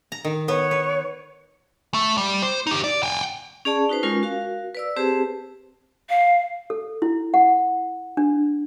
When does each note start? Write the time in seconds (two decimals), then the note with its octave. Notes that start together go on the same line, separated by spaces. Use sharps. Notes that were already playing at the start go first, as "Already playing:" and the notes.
0.12 A#5
0.25 D#3
0.48 B3 B4 C#5
0.71 B4
1.94 A3
2.17 G3
2.42 C5
2.67 D#4 G4
2.84 D5
3.03 G5 G#5
3.65 C#4 G#4 D5 A5
3.89 D#4 F#4 B4 C5
4.03 G#3 C#4 F4 A#4
4.23 F#4 A#4 F5
4.75 B4 D5 E6
4.97 C4 G4 G#4 B4 C5 A5
6.10 F5
6.70 A4
7.02 E4
7.34 F#5
8.17 D4